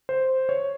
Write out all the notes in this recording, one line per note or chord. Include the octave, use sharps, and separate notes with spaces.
C5
C#5